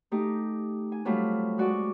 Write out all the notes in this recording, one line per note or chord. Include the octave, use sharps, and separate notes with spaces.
A3 D#4 G4
G#5
F#3 G3 A3 C4 E4 F4
G#3 F#4 D5